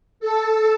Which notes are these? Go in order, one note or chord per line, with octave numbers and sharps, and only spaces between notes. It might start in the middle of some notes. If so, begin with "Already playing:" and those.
A4